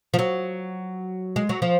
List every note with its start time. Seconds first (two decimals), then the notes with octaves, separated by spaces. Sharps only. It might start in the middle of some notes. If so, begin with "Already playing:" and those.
0.14 F3
0.19 F#3
1.36 G#3
1.49 F#3
1.62 F3